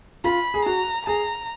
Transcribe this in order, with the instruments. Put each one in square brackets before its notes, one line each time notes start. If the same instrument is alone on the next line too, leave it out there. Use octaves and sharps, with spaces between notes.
[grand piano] F4 [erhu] B5
[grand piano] G#4
[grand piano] F#4 [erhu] A#5
[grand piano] G#4 [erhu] A#5